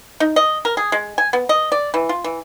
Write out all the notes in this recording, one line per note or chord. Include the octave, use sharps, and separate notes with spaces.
D#4
D#5
A#4
G#4
G#3
G#5
B3
D#5
D5
E3
F4
E3